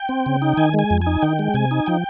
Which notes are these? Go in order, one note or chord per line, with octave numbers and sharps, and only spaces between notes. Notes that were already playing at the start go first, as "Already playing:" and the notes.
Already playing: G5
C4
C#3
D#4
D#3 G#5
G#3
G#5
F2
G#5
D#4
D#3 G5
G#3
C3 G#5
D#4
F3 G5